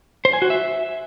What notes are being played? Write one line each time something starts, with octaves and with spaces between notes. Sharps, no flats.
C5
G#5
F#4
E5